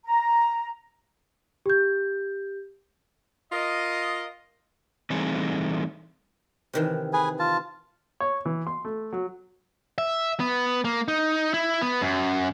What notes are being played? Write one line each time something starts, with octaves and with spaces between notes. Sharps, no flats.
A#5
G4 G6
F4 A#4 D#5
E3 G3 A3 C4 D#4 G#4
C3 D#3 E3
G#4 B4 G#5
F4 A5
C#5
E3
C6
A3
F#3
E5
B3
A#3
D#4
E4
B3
F#2